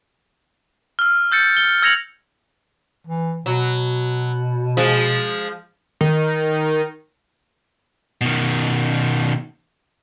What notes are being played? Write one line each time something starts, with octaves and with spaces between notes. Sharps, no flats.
E6 F6
E6 G6 A6 C#7
G7
E6 G#6 A#6 C#7 F7 F#7
E3
B2 F#3
F3 G#3
D#3
B2 D#3